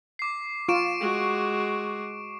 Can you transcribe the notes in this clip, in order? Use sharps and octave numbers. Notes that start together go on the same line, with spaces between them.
D6 C7
F4 C#6 D7 E7
G#3 F#4